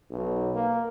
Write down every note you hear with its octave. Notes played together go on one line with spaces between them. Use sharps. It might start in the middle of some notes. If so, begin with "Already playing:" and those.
B1
A#3